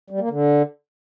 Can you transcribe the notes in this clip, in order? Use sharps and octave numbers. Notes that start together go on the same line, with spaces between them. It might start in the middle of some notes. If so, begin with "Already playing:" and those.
G3
A#3
D3